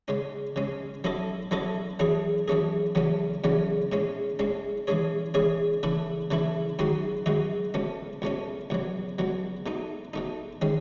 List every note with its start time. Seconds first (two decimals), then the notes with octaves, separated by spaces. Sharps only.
0.08 C#3 G#3 C#4
0.56 C#3 G#3 C#4
1.04 F#3 C#4 E4 A4 D#5
1.51 F#3 C#4 E4 A4 D#5
1.99 F#2 E3 A3 C#4 G#4
2.48 F#2 E3 A3 C#4 G#4
2.95 E2 C#3 F#3 A3 C#4
3.44 E2 C#3 F#3 A3 C#4
3.92 A2 G#3 C#4
4.39 A2 G#3 C#4
4.87 E3 G#3 C#4 G#4 C#5
5.34 E3 G#3 C#4 G#4 C#5
5.83 C#3 E3 A3 E4
6.31 C#3 E3 A3 E4
6.79 F#2 D#3 G#3 D#4 F#4
7.26 F#2 D#3 G#3 D#4 F#4
7.74 C#2 B2 A3 C#4
8.22 C#2 B2 A3 C#4
8.70 C#2 B2 F#3
9.19 C#2 B2 F#3
9.66 B2 A3 D#4
10.13 B2 A3 D#4
10.62 D#3 G#3 C#4